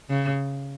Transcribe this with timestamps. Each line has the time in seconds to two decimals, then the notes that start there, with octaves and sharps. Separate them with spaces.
0.10 C#3